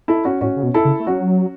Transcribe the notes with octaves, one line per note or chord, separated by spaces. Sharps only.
E4 A4
C#4 F#4
A2 C#4 F#4
C#3
B2
E4 A4
C#3
A3
F#3 C#4 F#4